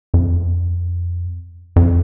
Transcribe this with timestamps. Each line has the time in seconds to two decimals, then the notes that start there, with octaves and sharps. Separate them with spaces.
0.14 F2
1.76 F2